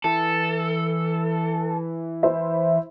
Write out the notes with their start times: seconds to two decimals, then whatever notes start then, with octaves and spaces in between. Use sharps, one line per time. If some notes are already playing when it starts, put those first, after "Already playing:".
0.04 E3 A4
2.23 E4 C5 E5